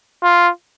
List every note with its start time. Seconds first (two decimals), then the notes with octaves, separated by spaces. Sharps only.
0.23 F4